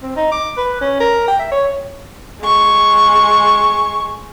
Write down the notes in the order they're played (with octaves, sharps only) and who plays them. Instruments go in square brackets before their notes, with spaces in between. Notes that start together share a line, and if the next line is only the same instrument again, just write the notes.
[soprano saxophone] C4
D#4
D6
B4
C#4
A#4
G5
E5
C#5
[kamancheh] G#3 C#6